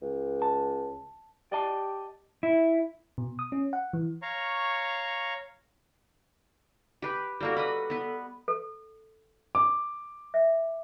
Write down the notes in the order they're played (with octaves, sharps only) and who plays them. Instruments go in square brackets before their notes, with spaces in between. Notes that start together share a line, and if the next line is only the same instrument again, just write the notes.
[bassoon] C#2
[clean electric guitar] A5
[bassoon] G4 [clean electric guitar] D5 D#5 A5
[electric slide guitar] E4
[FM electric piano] B2
D#6
C#4
F#5
E3
[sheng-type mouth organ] C#5 F5 A#5 C#6
[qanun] G4 B4
[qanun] G3 A#3 F#4 [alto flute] A4
[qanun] B4 D#5 B5
B3 B4
[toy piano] A4
[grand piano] D6
[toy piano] E5